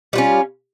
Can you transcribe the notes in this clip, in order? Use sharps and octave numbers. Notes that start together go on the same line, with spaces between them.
G3 C#4 F4